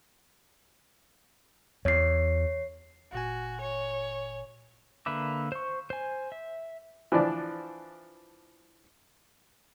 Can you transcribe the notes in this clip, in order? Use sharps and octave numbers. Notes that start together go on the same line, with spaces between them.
E2 C#5 C7
G1 A#2 F#4 G#5
C#5
D3 A#3 B4 E5 D6
C5 C#6
C5 G#5
E5
E3 F3 D4 D5